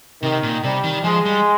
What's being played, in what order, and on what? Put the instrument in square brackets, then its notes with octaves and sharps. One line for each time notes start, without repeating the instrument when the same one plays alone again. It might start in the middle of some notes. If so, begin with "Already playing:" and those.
[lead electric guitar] C3 [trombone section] D#3
[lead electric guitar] A#2
[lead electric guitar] C3 [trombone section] G3
[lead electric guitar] D#3
[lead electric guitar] F3 [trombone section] G#3
[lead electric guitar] G3